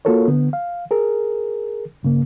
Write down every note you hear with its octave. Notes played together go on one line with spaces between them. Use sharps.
A#3 F4 F#4 A4 A#4 C#5
D3 B3
F5
G#4 A#4
G2 C#3 A#3